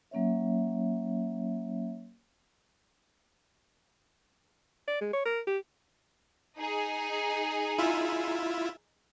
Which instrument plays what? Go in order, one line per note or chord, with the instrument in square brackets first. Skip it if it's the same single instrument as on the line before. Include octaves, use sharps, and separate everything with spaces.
[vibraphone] F#3 A#3 C#4 C#5 E5
[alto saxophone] D5
G#3
C#5
A#4
G4
[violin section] D#4 G#4
[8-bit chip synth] E4 F4 E5